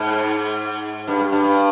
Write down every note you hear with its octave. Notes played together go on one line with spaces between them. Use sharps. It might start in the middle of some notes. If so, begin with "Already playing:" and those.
Already playing: G#2
G2
G2